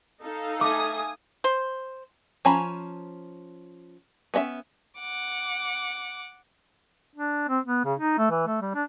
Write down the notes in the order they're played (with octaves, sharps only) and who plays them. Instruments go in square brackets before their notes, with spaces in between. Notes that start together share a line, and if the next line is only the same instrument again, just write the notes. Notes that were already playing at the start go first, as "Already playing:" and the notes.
[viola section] D#4 A4 F5
[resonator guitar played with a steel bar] A3 [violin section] G#5 D#6 [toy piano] D6
[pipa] C5
[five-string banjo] F3 C#4 G#5 A#5 B5
B3 C#4 D#5 E5
[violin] F#5 D6
[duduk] D4
C4
B3
C#3
D#4
A3
E3
A3
G3
D4